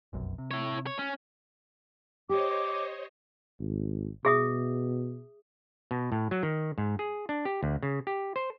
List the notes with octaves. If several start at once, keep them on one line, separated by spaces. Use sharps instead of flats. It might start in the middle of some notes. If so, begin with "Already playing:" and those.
F1 B1 F#2
C3
E4 C#5
C#5
C#4
G4 C5 C#5 D#5 D6
G#1
B2 G#4 E5 D#6
B2
A2
F#3
D#3
G#2
G#4
D4
G4
D2
C#3
G4
C5